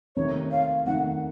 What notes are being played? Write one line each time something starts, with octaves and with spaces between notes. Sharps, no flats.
C3 D#3 A3 D#4 C#5
F5
C3 D#3 A3 D#4 F#5